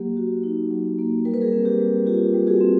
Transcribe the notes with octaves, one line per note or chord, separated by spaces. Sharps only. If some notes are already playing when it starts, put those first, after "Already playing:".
Already playing: F#3 A#3 G4
F#4
D#4
F#3
A#3
G3 A#4
B4
G#4 A#4
C4
G4
G3
F4 G4
G3
F#4 G#4
C4